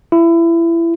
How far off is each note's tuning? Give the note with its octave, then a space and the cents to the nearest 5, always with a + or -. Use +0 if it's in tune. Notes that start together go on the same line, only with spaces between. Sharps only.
E4 +25